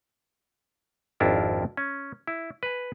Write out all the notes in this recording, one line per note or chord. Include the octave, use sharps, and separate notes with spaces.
G#1 F2 D4 E4 F4 A#4
C#4
E4
B4 G#5